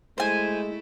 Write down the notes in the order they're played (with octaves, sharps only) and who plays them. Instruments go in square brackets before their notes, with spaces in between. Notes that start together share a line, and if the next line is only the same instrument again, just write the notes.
[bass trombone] G#3 [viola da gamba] A3 E4 [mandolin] C5 G#5